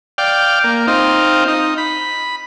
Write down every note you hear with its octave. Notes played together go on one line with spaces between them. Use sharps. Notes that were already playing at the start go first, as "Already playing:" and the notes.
D5 F5 G5
A#3
C4 D#4 F4
D#4
B5